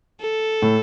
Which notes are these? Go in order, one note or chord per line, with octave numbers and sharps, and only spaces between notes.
A4
A2